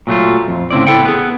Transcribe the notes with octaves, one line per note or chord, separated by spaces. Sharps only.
A#2 F#3 A3 F4
F2
A2 C#3 C4 E4 D5
B3 E4 A4 F#5 G5
B3 G#4